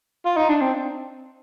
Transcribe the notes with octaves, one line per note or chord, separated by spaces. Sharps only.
F4
D#4
D4
C4